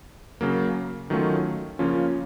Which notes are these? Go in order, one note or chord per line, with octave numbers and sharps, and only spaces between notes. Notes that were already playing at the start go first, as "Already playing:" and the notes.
C#3 F#3 A#3
D#3 F#3 A3 C#4 F4
C#3 F3 A#3 C#4 F4